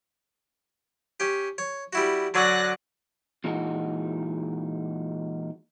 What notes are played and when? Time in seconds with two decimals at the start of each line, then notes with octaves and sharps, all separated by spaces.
1.20 C#4 G4
1.58 C#5
1.93 G3 E4 F#4
2.34 D3 F#3 C#4 D5 F#6 A#6
3.44 A#2 E3 G#3 D#4 F4 F#4